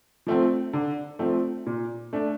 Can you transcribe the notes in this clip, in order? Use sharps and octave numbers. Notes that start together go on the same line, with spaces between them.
F3 A3 C4
D3
F3 A3 C4
A#2
A3 D4